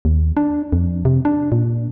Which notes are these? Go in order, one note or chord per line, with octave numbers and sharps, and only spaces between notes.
D#2
D4
F2
C3
D4
A#2